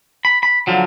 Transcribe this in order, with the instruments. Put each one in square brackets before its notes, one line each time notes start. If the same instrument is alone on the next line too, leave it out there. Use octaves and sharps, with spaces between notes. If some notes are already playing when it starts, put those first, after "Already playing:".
[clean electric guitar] B5
B5
D3 F3 F#3